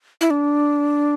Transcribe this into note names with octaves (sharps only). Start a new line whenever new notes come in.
E4
D4